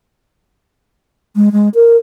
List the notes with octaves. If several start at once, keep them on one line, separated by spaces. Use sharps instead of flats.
G#3
G#3
A#4